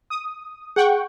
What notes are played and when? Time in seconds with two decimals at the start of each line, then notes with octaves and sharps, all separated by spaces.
0.10 D#6
0.76 G#4 F#5 G5 C#6